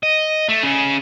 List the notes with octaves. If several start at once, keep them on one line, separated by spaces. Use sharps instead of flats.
D#5
A3
C#3 C#4